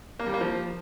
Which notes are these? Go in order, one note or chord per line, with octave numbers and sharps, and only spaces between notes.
A#3
G3
A#3
F3